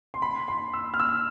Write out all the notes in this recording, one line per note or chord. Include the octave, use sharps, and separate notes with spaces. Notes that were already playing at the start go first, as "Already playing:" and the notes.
C6
B5
C6
E6
F6
E6